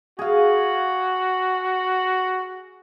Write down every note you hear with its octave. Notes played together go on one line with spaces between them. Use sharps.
F#4 G#4 F5